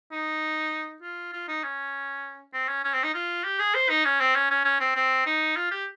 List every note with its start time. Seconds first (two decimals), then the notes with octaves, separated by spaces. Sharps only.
0.12 D#4
1.02 F4
1.33 F4
1.48 D#4
1.63 C#4
2.54 C4
2.69 C#4
2.84 C#4
2.94 C4
3.04 D#4
3.14 F4
3.44 G4
3.59 G#4
3.75 C5
3.89 D#4
4.05 C#4
4.21 C4
4.36 C#4
4.51 C#4
4.65 C#4
4.80 C4
4.96 C4
5.26 D#4
5.56 F4
5.71 G4